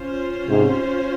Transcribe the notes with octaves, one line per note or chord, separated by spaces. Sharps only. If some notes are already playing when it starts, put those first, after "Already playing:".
Already playing: C#4 F4 C5
G#2 C3